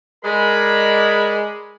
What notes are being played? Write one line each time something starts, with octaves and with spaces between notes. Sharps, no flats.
G#3 A#4 D5 B5